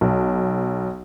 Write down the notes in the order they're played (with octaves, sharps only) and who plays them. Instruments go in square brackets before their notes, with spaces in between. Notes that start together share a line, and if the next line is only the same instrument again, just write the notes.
[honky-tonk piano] B1